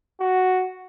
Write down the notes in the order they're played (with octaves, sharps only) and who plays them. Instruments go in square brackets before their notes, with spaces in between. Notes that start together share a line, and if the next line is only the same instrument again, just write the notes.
[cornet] F#4